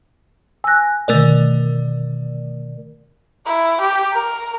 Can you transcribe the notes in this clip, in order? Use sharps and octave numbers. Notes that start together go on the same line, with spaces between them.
G#5 E6 F#6 A#6
B2 D3 D#3 A3 A#4 D5
E4
G4
A#4